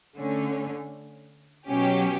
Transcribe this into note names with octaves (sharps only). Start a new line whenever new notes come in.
D3 A3 C#4
B2 F#3 C#4 G4